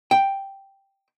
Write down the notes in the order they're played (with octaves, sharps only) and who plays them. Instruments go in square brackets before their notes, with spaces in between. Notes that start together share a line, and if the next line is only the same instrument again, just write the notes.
[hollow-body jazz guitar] G5